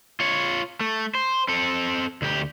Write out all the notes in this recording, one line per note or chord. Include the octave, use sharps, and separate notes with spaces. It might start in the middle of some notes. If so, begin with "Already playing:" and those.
F4 C#5
A3
C5
C4 A4
D2 G4